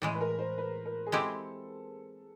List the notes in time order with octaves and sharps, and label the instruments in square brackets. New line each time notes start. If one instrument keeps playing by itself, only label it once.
[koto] A2 E3 G#3
[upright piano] B4
A#4
C5
B4
A#4
G#4
[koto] G#3 C4 E4 G4 [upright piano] A4